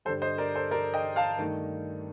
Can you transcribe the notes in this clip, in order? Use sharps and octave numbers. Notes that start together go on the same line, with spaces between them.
G2 D3 G3 A4 C5
C5 D#5
A#4 D5
A4 C5
A#4 D5
D#5 G5
F5 A5
G2 D#3 A3 D#4